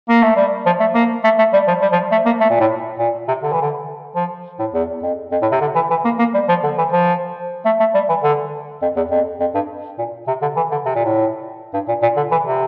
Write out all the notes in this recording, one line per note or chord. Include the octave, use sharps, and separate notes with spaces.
A#3
A3
G3
F3
A3
A#3
A3
A3
G3
F3
G3
F3
A3
A#3
A3
A#2
A2
A#2
C3
D3
E3
D3
F3
A2
E2
F2
F2
A2
C3
D3
E3
E3
A#3
A#3
G3
F3
D3
E3
F3
A3
A3
G3
E3
D3
F2
E2
F2
F2
G2
A#2
C3
D3
E3
D3
C3
A#2
A2
G2
A#2
A#2
D3
E3
C3